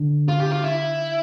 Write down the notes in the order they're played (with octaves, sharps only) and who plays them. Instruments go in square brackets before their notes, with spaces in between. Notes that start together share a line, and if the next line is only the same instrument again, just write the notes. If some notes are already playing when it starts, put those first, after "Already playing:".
Already playing: [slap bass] D3
[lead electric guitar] F4
G4
F4
E4